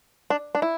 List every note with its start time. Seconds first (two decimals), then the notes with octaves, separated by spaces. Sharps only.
0.30 D4
0.55 D4
0.62 E4